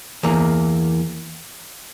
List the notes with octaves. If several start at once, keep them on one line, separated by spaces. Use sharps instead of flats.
E2 E3 A#3